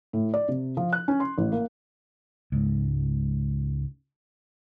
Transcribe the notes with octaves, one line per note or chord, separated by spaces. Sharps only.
A2
D5
C3
F3
F#6
C#4
C6
A1
A#3
C#2 G#2